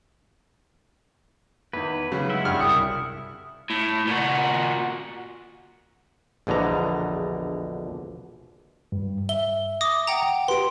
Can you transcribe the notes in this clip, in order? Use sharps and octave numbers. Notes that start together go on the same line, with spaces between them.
E2 D#3 B4
C#3 F#3
G#3 E4 E5 F#5
G2 G4 G#4 F6
F#1 C2 D#6 C#7
A2
A#2 F#4
A#1 E2 B2 D3 A#5
G2
E5 G7
D6 D#6 A#6
F#5 G5 A#5
G4 B4 C6 D7